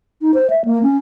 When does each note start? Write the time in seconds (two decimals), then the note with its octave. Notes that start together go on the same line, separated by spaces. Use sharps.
0.22 D#4
0.34 C5
0.50 E5
0.65 A#3
0.83 C#4